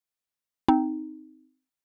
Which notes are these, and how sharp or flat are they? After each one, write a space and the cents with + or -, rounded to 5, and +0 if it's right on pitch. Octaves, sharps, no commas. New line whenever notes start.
C4 -10 D#4 +0